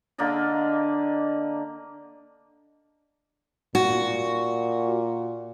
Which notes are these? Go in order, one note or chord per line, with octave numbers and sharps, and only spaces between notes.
D3 A#3 D5 D#5
A#2 F#4